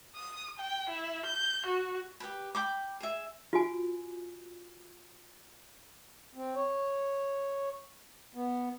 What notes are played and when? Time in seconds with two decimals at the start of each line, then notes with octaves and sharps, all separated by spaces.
0.16 D#6
0.59 G5
0.90 E4
1.26 G6
1.67 F#4
2.20 G4 B4 B5
2.55 G5 B5 D6
3.01 G#4 E5
3.53 F4 F#4 G#5
6.35 C4
6.55 C#5
8.35 B3